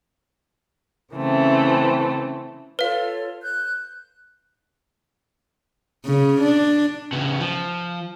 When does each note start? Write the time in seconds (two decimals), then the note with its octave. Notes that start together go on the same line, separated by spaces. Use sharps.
1.14 C#3 E3 A3 C4
2.79 F4 A4 B4 C#5 F5
3.43 F#6 G6
6.05 C#3
6.41 D4
7.13 C#3 B3
7.40 F3